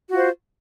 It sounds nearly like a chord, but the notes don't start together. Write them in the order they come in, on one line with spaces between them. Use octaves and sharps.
F#4 F4 C5